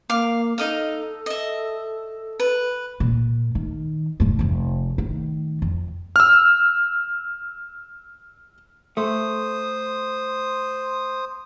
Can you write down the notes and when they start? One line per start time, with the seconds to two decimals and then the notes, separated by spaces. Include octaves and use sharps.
0.10 A#3 F5 D6
0.58 D#4 A4 D#5 F5
1.26 D#5 E5
2.40 B4
3.00 A#2
3.55 D#3
4.20 F1 G2
4.39 F1 F3
4.98 A2 D#3
5.62 F2
6.16 E6 F6
8.97 A3 C5 D#6